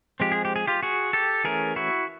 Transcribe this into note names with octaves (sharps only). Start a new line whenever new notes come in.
F3 G#3 C4 G4
G#4
G4
G#4
F4 G4
F#4 G#4
G4 A4
E3 A3 C#4 G#4 A#4
E4 F#4